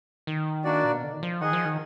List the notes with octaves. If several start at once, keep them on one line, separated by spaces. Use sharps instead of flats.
D#3
A#3 D4 F#4 D5
A#2
B2
D3
D#3
F3
D#3 G#4 D#5 F#5
F3
D#3